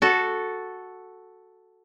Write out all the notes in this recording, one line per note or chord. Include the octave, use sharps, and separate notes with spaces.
F#4 A4